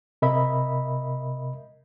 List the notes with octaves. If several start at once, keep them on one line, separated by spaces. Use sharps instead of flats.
C3 A#4 D#5 E5 B5